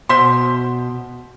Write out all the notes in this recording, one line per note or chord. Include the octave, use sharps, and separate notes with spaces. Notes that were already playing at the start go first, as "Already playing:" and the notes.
B2 C5 E5 C6